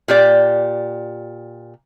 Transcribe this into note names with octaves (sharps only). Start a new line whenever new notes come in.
A#2 G4 D5